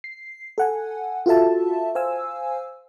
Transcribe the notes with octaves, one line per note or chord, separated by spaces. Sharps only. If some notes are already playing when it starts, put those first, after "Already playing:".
C7
A4 F#5 G#5
F4 F#4 A4 E5 A5
C5 F5 G#5 E6